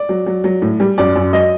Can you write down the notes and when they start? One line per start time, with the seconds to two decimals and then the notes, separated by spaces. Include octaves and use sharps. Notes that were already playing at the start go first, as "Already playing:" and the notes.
Already playing: D5
0.09 F#3
0.26 F#3
0.44 F#3
0.62 A2
0.80 G3
0.98 F#2 D5
1.16 F#2
1.33 F#3 D#5